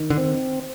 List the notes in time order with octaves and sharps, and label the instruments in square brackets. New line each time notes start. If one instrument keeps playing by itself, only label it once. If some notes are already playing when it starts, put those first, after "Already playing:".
Already playing: [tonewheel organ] D#3
[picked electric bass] D3
[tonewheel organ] C4